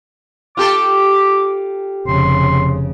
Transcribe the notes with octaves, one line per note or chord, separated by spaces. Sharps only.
F4 G4 A4 D6
F1 C#3 C6